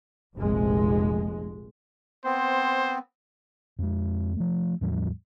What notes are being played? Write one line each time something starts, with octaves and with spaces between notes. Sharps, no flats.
F1 A#1 G#3
B3 C4 C5
F2 G#3
F3 A3
E2 A2 F3 G3